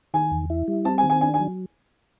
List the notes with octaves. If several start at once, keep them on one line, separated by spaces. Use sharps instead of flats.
D#3 G#5
E2
E4
G3
C4 A5
G#5
D#3
G#5
D4 G#5
G#5
F#3